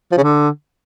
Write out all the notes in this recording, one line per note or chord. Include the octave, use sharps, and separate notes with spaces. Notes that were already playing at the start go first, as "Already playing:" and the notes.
F3
C#3
D3